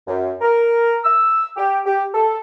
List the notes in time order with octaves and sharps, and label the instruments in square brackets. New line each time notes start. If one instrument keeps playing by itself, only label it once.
[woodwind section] F#2
A#4
E6
G4
G4
A4